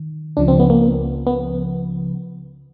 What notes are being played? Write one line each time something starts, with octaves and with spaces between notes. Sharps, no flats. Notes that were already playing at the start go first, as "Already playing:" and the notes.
Already playing: D#3
C#2 C#3 F3 D4
C4
B3
A#3
B3